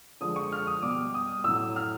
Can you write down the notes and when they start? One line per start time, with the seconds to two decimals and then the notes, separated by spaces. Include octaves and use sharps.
0.21 D3 F3 G#3 D#6
0.36 C#6
0.52 F6
0.67 D#6
0.82 B2 G3 D6
1.14 D#6
1.44 A2 F#3 E6
1.76 F6